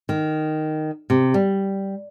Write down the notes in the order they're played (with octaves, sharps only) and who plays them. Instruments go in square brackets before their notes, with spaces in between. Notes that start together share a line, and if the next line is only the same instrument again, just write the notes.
[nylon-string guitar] D#3
C3
G3